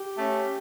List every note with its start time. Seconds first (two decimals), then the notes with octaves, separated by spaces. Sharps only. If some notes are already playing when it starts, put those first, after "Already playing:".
Already playing: G4
0.17 A3 C#4